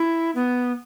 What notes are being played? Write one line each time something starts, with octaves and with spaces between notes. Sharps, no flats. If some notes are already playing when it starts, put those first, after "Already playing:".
Already playing: E4
B3